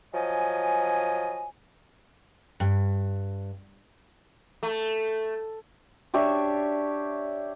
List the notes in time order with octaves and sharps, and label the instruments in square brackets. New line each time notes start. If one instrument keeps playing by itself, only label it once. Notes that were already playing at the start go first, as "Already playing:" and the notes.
[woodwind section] F3 F#3 D#5 G#5
[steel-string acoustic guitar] G2
[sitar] A3
[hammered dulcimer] D4 G4 C#5 E5